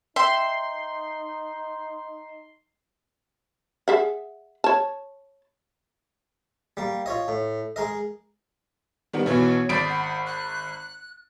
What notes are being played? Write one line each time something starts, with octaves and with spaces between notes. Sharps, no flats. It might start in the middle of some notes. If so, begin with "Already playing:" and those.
D#4 E5 G5 C6
G#4 E5 F#5
C#5 A5
G3 A#3
F4 C#5 D#5
A2
G#3 A#4 D#5
D#3 G3 B3
B1 B2 E3 B3 C#5
G#1 D5 B5 D#6 A6 B6 D7
F#5
F#6